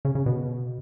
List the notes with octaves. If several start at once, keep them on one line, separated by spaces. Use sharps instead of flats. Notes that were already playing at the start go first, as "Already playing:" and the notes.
C#3
C#3
B2